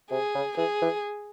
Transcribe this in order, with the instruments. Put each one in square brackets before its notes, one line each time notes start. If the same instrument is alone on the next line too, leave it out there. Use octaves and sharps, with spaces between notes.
[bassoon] C3 [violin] G#4
[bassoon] C#3
[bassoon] E3 [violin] G#4
[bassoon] E3